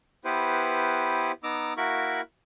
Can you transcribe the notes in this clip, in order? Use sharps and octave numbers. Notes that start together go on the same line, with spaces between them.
B3 E4 G4 B4 C5
B3 D#4 A#5 D6 E6
A#3 E4 F#4 A#4 B5 C#6